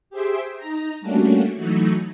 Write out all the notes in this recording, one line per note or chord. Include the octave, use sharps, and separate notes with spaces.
G4 G#4 C5 E5 G5
D#4 A#5
G3 A3 A#3 C#4 D4 F#4
E3 F#3 A3 D#4 F#4